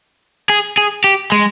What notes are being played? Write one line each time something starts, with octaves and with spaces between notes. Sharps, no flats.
G#4
G#4
G4
G#3